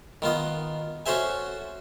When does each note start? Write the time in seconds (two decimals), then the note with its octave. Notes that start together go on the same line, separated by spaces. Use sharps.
0.22 D#3 B3 F4 D#5
1.06 C#4 F#4 A4 C5 E5 G#5